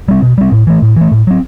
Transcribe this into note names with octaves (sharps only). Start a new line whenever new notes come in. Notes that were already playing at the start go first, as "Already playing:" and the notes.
G3 C4
B2
G3 C4
A2
E3 A3
A2
E3 A3
A2
F#3 C4